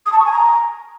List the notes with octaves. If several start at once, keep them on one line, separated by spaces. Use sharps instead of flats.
D#6
A5
C#6
G#5
A#5